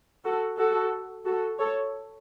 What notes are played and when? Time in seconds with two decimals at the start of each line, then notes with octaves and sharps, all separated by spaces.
0.24 F#4 A4
0.58 F#4 A4
1.25 F#4 A4
1.59 A4 C#5